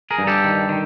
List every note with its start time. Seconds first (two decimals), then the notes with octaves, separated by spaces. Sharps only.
0.11 G#4 A#4
0.18 G2
0.27 G4 A4
0.44 D#3
0.69 D#3